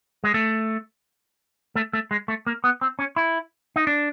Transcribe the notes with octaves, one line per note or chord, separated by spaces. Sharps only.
G#3
A3
A3
A3
G#3
A3
A#3
B3
C4
C#4
E4
D#4
D4